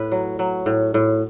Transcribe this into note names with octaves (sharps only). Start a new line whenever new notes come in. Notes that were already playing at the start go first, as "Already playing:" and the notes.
Already playing: A2 B4
F#3
F#3
A2
A2